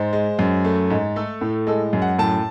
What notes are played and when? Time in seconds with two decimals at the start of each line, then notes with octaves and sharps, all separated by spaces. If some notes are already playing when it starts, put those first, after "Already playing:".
Already playing: G#2 C5
0.13 G#3
0.39 F#2
0.65 A3
0.90 G#2
1.16 A3 A4
1.41 A2
1.67 G#3 A4
1.93 F#2
2.02 F#5
2.19 A2 A5